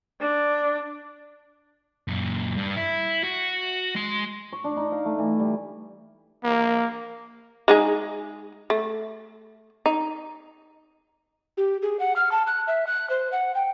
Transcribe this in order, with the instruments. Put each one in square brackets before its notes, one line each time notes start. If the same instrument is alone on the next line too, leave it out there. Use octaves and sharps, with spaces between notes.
[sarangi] D4
[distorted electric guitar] F#2 A#2
G2
E4
F#4
G#3 C6
[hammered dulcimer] C#6
D4
D#4
F5
A3
E3
G3
[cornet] A#3
[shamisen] G#3 D#4 G#4
A3
D#4
[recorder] G4
G#4
F#5
F6
A5
F#6
E5
F#6
C5
F#5
G5